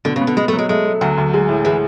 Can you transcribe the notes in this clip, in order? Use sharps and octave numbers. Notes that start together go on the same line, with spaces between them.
B2 D3
C#3
B3
D3
G#3 B3
A3
F#3
G#3
G#3 A3
A3
D2 F#3
D2
G#3
A2
E3 G#3